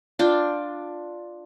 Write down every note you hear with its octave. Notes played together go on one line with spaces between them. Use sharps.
D4 F4 G5